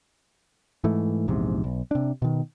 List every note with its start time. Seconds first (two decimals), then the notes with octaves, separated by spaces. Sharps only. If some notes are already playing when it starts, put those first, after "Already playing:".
0.84 G#2 E3 A3
1.28 A#1 E2 G#2 C3
1.64 B1
1.91 C3 D4
2.22 B2 D#3